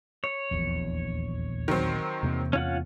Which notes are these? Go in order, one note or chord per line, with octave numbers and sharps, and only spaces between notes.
C#5
D#1 A#1 E2
D#3 F#3 C4
E2 C3 A#3
C#4 F4 F#5